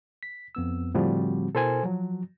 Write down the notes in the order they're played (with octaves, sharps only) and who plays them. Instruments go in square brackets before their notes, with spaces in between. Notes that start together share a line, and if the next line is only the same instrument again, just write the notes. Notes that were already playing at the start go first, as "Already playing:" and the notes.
[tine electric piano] B6
F2 B3 E6
[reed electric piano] A2 F3 G3 [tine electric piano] D3 C4 F#4
[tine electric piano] B2 E4 A#4 [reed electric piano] A4 C5 G#5
[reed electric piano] F3 F#3 [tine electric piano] F#4